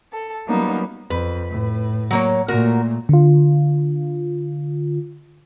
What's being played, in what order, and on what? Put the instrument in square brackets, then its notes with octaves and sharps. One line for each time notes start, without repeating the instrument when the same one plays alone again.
[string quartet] A4
F#3 G3 A#3 B3 C#4 D#4
[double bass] F2 [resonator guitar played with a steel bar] B4
[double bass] A2
[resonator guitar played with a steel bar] F#3 A#3 C#5
[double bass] A#2 A3 [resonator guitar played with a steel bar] F#4 A#4
[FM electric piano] D3 F4